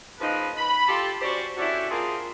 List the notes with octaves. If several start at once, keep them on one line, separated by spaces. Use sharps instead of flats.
C#3 F3 A#3 D#4 B4
B5
F4 G4 A4
C#4 F#4 G4 C5 D5
C#4 D4 E4 F#4 G4 A4
A#3 C4 D4 F4 G#4